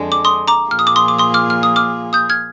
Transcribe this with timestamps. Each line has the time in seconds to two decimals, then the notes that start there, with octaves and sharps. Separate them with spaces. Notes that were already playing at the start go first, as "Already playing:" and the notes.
Already playing: F2 D3 G#3 D4
0.12 D6
0.25 C6 D#6
0.48 A#5 D6
0.71 A#2 F3 A#3 F4 G#4 F6
0.79 D#6
0.87 D6
0.96 C6 D#6
1.08 D6
1.19 C6 D#6
1.34 D6 F6
1.50 F6
1.63 D#6
1.76 D6 F6
2.13 D#6 G6
2.30 F6 G#6